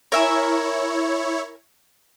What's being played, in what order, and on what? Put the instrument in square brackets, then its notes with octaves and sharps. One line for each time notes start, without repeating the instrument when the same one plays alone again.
[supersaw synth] E4 C#5 [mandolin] A#4 E5 G#5